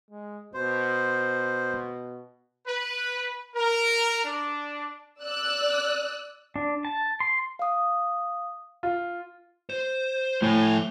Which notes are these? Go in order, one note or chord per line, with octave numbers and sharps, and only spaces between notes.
G#3
B2 C5
B4
A#4
D4
D5 E6 F#6
D4
A5
C6
F5 D#6
F4
C5
A2 F3 G#5